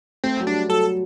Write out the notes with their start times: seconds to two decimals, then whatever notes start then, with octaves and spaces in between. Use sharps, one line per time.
0.24 A3 C4
0.40 F#3
0.46 G3 D4
0.69 F#3 A4